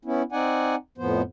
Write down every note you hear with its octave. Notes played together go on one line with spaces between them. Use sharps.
B3 C#4 E4
C4 D#4 D5 F#5 G#5
F2 A2 F3 B3 C5